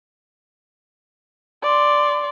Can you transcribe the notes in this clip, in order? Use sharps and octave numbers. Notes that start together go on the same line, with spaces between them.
D5 C6